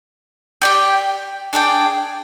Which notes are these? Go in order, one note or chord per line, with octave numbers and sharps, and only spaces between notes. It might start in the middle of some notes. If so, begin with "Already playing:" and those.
G4 D5 G5
D4 G#4 D5 G5